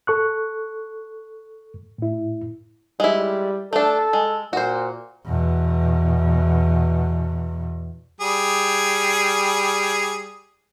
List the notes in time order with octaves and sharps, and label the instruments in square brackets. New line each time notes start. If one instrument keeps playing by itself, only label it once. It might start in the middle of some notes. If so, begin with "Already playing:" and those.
[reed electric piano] A4 C#6 F#6
A2 E4
[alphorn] G3 [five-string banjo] G#3 E4
[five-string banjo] A3 D4 [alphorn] A4
[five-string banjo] G#3
[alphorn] A#2 [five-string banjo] F#4 C5
[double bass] E2 B2
[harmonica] G3 G#4